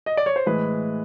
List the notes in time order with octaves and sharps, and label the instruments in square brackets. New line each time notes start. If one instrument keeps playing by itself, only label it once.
[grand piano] D#5
D5
C#5
C5
A2 E3 G#3 B4